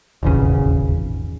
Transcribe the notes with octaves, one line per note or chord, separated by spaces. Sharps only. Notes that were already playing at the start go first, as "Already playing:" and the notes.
D#1 G#1 E2 C#3